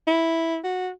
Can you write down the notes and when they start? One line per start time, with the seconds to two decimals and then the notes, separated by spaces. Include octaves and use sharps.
0.07 E4
0.64 F#4